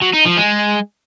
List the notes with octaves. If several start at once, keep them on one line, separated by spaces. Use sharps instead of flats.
F#3
D#4
F3
G#3